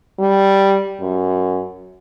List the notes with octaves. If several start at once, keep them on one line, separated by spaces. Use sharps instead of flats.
G3
F#2